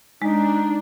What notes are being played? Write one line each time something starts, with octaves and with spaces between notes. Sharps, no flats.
G#3 D4 D#4